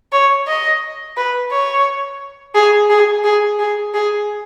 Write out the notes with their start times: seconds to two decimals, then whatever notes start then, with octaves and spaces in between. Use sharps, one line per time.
0.12 C#5
0.48 D#5
1.17 B4
1.51 C#5
2.55 G#4
2.90 G#4
3.24 G#4
3.59 G#4
3.94 G#4